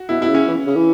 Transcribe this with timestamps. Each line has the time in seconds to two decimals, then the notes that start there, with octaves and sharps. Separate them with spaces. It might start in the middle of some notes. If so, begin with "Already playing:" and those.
Already playing: F#4
0.09 B2 E4
0.21 B2 E4
0.28 C#3
0.35 C#4
0.48 E3
0.67 C#3
0.76 E3